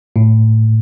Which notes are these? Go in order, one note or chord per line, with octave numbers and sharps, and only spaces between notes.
A2